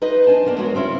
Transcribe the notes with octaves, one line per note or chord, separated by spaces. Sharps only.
D#4 B4 C5 D#5
D4 G#5 A5
B2 A#3 B3 D4
G#3 B3 F#4 A#4 C#5
C#3 C4 C#4 E4 F4